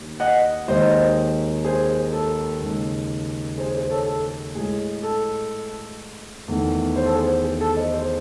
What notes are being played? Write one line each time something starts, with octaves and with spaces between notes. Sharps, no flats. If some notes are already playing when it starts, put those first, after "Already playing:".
Already playing: D#2 D#3
D#5 F#5
D#2 D#3 G#3 C5 D#5
G#4 C5
A4
D#2 C#3 G#3
G#4 C5
G#4 C5
A4 C#5
A4
A2 G#3 G#4
A4
E2 D#3 A3
C5
A4
G#4 C5
G#4
A4
C5 D#5
G#4 C5